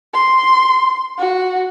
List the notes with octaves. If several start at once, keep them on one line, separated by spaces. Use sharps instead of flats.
C6
F#4